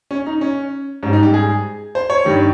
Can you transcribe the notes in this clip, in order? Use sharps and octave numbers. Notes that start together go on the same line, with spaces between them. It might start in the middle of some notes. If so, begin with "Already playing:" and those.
C#4
D#4
C#4
G#2 G3 C#4
D#4
G4
G#4
C5
C#5
G2 D#3 G3